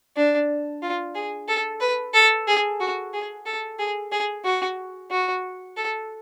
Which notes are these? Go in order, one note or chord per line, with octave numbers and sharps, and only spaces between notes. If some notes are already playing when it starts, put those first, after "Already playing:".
D4
F4
G#4
A4
B4
A4
G#4
F#4
G#4
A4
G#4
G#4
F#4
F#4
A4